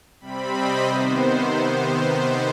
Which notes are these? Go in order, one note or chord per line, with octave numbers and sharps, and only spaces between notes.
C3 G3 C4 B5
D#5
C3 D#3 B3 C5